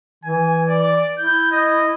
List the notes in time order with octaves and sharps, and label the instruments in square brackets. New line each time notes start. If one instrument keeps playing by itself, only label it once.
[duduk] E3 [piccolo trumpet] G#5
[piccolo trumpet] D5
[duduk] E4 [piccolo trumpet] G6
[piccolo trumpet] D#5